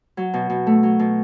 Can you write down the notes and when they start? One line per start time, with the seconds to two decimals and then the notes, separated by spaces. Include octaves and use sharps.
0.17 F#3
0.34 B2
0.50 B2
0.67 A3
0.83 F#3
0.99 B2